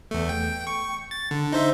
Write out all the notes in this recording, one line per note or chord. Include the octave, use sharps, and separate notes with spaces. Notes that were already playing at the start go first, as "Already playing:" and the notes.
E2 A3
G5
C#6
A6
D3
D#4 C5 E5